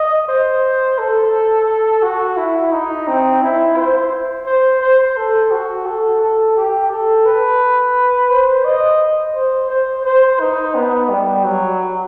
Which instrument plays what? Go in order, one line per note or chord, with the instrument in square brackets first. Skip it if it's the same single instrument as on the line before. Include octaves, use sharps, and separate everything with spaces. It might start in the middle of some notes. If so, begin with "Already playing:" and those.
Already playing: [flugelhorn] D#5
C5
A4
F#4
E4
D#4
C4
E4
C5
C5
C5
A4
F#4
A4
A4
G4
A4
B4
C5
D#5
C5
C5
C5
D#4
B3
G3
F#3